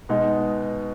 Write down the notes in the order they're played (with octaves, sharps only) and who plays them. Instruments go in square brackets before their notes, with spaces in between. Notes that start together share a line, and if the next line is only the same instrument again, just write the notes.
[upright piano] B2 G#3 B3 D#4